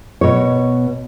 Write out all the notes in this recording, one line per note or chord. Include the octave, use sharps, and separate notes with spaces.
B2 C#5